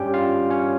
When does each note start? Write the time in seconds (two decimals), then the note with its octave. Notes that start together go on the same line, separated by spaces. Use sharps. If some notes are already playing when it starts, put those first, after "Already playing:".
Already playing: G2 G3 C#4 G4 G5
0.14 F4 F5
0.50 C#4 C#5